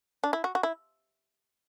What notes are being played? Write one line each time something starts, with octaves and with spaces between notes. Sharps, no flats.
D4
E4
F#4
F#4
E4